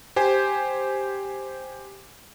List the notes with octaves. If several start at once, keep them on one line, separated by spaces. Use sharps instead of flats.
G4 C5 G#5